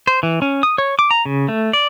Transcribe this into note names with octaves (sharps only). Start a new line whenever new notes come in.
C5
E3
C#4
D#6
C#5
D6
A#5
C#3
A3
D5